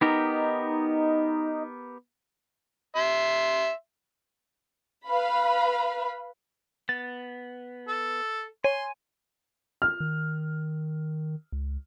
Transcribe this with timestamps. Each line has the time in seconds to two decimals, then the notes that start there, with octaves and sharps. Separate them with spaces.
0.01 B3 D#4 G4 A#4
2.96 E5 C6
5.07 B4 F5 B5
6.89 B3 A6
7.88 A4
8.64 C#5 G#5 C6
9.82 F6
10.00 D#3
11.52 C#2